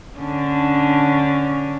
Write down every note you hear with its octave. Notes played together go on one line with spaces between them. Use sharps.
D3 C#4 D4